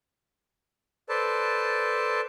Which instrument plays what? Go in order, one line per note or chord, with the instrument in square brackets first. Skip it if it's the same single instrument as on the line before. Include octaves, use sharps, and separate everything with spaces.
[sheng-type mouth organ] A4 B4 C5 D5 A5